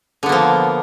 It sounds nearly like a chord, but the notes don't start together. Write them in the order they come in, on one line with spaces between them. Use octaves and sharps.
D3 B3 A#3 F3